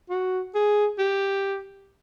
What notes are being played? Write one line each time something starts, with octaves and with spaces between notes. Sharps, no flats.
F#4
G#4
G4